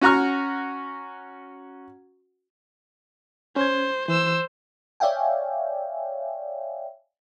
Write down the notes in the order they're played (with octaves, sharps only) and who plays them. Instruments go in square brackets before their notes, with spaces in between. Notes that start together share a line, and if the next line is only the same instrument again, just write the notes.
[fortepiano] C#4 F#4 F#5 A#5 C#6 F6
[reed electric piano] C#4 G#6 [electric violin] C5
[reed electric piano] E3 [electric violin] C5 E6
[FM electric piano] C#5 D5 E5 F5 G5 G#5